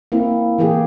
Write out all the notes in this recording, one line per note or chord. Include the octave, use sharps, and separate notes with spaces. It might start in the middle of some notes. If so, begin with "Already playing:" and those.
A#3 C4 E4
E3 A#3 G4 G#4